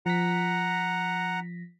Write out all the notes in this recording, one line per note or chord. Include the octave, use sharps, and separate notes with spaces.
F3 F#5 A#5 A#6 B6